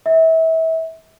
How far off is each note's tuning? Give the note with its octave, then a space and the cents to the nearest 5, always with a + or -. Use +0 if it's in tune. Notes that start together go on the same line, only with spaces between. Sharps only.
E5 -30